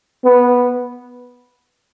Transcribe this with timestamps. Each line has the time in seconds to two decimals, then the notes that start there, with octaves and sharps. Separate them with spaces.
0.24 B3